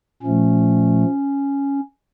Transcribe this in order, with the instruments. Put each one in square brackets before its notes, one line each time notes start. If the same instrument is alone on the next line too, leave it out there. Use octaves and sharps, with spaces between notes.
[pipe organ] A#2 F3 A3 C#4